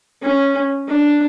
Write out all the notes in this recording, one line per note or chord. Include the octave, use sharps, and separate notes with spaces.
C#4
D4